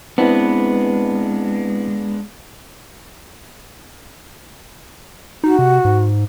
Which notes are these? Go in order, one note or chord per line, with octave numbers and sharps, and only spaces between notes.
G#3 B3 C4 D4 E4 B4
D#4 F#4
C3
G#2